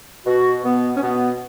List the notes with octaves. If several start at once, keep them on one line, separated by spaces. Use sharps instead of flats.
B2 F#4
B2 B3
C#4
B2 B3